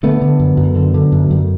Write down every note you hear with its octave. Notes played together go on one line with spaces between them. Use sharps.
D3 A3 B3
D3
F#2
F#2
D3
D3
F#2
F#2